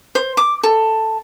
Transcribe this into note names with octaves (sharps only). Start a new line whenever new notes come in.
C5
D6
A4